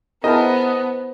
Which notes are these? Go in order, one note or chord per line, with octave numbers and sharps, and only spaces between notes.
B3 E4 G#4 A#4 C5 D#5 A5